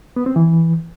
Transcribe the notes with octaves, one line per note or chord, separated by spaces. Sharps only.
B3
C4
E3